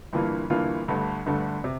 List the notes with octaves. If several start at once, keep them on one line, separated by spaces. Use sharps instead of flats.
G1 G2 E3 A#3 F4
G1 G2 E3 A#3 F4
G1 G2 D3 A3
G1 G2 D3 A3
C3